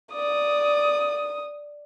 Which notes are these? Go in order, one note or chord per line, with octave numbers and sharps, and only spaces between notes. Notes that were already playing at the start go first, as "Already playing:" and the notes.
D5 D#6